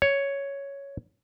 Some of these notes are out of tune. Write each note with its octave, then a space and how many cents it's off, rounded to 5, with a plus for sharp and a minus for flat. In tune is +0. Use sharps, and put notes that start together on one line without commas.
C#5 +5